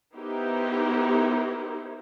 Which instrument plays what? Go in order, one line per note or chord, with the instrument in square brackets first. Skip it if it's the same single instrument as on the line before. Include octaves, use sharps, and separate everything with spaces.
[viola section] B3 D#4 E4 G4 A#4 C5